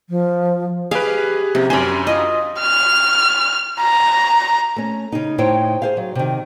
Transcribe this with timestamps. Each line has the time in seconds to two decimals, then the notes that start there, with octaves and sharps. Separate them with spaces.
0.10 F3
0.91 G#3 G4 G#4 B4 F5
1.55 F2 C3 A#3
1.70 F#2 C#4 D4 G4 A#4 C5 G#5 B5
2.07 F4 D#5
2.59 F6
3.81 A#5
4.76 A3 C#4
5.12 C#3 D#4
5.38 A2 D#4 E4 C5 C#5 G5
5.82 G#4 C5 F5
5.97 F#3
6.15 C3 D#3